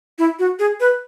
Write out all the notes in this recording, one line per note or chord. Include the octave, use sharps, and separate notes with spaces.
E4
F#4
G#4
B4